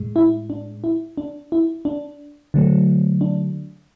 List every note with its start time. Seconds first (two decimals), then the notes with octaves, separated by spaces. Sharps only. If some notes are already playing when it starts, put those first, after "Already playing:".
Already playing: A2 G#3
0.16 E4
0.50 D4
0.84 E4
1.18 D4
1.52 E4
1.85 D4
2.54 D3 F#3 A3
3.21 D4